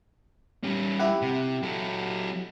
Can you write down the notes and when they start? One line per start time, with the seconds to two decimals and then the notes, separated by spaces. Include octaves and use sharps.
0.63 G3 C#4
0.99 E4 G4 F#5
1.22 C3
1.63 F#3 A4